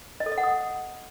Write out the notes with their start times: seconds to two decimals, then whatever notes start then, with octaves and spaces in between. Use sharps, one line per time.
0.20 D#5
0.26 A4
0.32 D#5
0.38 F#5
0.43 D#6